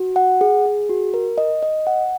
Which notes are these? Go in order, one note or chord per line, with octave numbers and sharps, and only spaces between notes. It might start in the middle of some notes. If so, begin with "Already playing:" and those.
Already playing: F#4
F#5
G#4
G#4
F#4
A#4
D#5
D#5
F#5